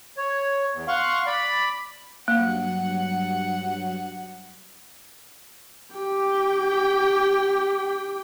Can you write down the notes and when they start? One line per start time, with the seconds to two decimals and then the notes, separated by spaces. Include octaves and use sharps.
0.17 C#5
0.74 E2
0.88 F5 F#5 C6 C#6
1.27 D5 B5
2.28 G2 F#3 A#3 F#5
5.96 G4 G5